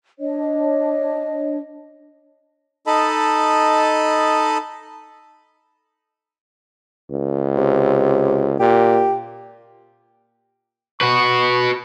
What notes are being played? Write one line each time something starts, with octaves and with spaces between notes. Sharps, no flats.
D4 C#5 D#5
D#4 A4 D#5 A5 B5
C#2
C3
A#2 G4
F#4 B4 C#6